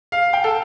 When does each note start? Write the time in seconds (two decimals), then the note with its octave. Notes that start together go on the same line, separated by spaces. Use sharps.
0.12 F5
0.33 G5
0.44 A4